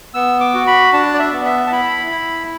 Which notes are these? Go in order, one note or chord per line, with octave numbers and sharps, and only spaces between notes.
B3 E6
D6
F#4
B5
D4 A5
D5
E5
B3
E5
A5
E4 B5
E4